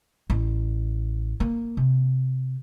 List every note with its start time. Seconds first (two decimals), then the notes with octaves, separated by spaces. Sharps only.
0.30 A1
1.40 A#3
1.77 C3